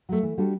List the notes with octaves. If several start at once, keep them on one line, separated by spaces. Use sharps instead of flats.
F#3 A3
E3
G3 D4 F#4 A4